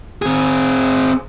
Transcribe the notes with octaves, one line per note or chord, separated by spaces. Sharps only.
C4 G#4